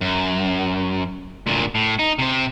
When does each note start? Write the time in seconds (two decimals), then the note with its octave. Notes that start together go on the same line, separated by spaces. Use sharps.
0.01 F#2
1.47 D2 A#2
1.75 A2
1.99 D#4
2.19 C3 C4